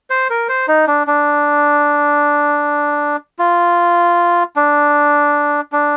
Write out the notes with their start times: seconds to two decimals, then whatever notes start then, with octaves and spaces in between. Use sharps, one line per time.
0.10 C5
0.30 A#4
0.49 C5
0.68 D#4
0.87 D4
1.07 D4
3.39 F4
4.56 D4
5.72 D4